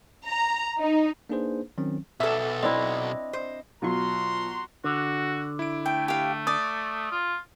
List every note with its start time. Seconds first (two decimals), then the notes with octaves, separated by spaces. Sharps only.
0.24 A#5
0.80 D#4
1.29 A#3 D4 D#4 G#4 B4 C5
1.78 D#3 F#3 C4 C#4
2.20 B1 A4 E5
2.63 C4 D4 E4 D#5
3.33 C5
3.82 B2 F#3 F4 F#4 A#5 C6
4.84 D3 F#4
5.59 E4 D7
5.86 A3 G5
6.08 G4 F5
6.47 D5 D6 D#6
7.11 F4